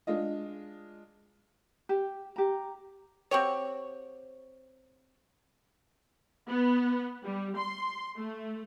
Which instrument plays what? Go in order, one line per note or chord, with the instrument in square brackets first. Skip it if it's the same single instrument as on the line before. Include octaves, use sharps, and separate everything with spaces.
[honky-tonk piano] G#3 D4 F4 D#5
[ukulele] G4
G4 A#5
[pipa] C4 F#4 G4 C#5
[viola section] B3
G3
C6
A3